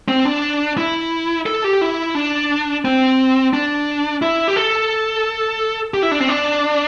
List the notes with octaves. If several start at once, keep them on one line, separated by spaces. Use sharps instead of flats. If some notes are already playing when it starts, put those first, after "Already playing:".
C4
D4
E4
A4
G4
E4
D4
C4
D4
E4
G4
A4
G4
E4
D4
C4
D4